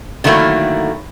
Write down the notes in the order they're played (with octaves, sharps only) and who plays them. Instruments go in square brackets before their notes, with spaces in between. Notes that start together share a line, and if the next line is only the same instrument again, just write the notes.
[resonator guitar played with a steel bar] D3 D#3 F#3 A3 A#3 E4